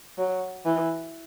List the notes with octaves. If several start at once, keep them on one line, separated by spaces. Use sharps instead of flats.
F#3
E3